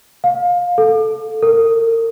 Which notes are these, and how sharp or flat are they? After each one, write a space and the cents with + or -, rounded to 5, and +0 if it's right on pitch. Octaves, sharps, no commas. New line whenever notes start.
F5 +20
A4 -5
A#4 -35